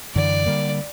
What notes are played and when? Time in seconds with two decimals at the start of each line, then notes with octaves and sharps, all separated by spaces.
0.15 F#2 D3 E3 D5
0.46 D3 G3 A#3